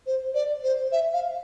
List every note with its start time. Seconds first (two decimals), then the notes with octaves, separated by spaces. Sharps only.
0.06 C5
0.34 D5
0.63 C5
0.92 E5
1.13 F5